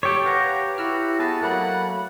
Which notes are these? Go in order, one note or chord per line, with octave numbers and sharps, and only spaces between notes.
G4 A4 C#5 B6
B4 F5 F#5 A#5
E4 F#4 B5 E6 F6
B3 G#4 B4 A5
F#3 A3 A#3 F#5 B5